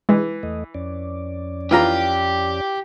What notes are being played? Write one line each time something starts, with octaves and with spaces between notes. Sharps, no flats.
E3 G#3
E2 A3 D#5
F2 C#4 D5
E3 F4 G4 A#5